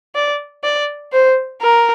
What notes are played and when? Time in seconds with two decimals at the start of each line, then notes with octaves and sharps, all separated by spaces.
0.15 D5
0.64 D5
1.13 C5
1.62 A#4